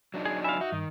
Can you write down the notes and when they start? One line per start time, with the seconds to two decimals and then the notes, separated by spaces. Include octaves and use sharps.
0.14 F#3 D4 D#4
0.25 G#4
0.44 E5 F5 G#5 B5
0.61 D#4 F#4 E5
0.72 G2 D#3